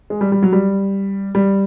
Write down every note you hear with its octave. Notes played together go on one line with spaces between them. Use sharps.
G#3
G3
G3
F#3
G3
G3